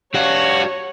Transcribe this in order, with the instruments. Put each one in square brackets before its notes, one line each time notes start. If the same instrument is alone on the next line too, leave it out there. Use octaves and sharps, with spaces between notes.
[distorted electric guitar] F#4 [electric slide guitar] G4 D5 F5 [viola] C#5